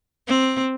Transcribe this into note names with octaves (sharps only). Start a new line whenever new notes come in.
C4